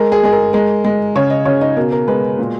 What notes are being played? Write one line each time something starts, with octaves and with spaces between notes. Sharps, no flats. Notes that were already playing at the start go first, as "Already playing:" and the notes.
Already playing: G#3 A#4
G#4
G#3 G#4
A#4
G#3 A#4
G#3
C#3 C#5
D#5
C#3 C#5
D#4
B2 A#4
A#4
G#3 B4
A#2